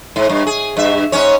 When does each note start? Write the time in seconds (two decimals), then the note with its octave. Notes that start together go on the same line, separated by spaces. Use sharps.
0.16 G#2
0.29 G2
0.47 G#4
0.77 G2 E5
1.12 G#2 C#4 C#5